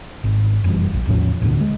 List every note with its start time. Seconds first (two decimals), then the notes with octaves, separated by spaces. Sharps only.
0.24 G#1
0.64 F1 F#2 E3 G3
0.94 A#1
1.07 E2 A2 F3 C#4
1.42 A1 D2 A#2 D3
1.61 G#3